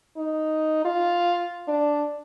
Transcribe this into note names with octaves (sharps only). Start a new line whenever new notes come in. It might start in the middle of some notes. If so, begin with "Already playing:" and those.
D#4
F4
D4